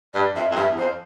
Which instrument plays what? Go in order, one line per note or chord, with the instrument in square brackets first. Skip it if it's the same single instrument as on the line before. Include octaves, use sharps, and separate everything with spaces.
[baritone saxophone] G2 [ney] D5
[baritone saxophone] F2 [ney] E5
[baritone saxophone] F2
[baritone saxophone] G2 [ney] E5
[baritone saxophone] E2
[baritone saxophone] F2 [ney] C5